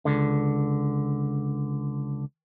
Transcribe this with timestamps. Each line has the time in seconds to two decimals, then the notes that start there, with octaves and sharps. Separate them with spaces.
0.05 C#2 D3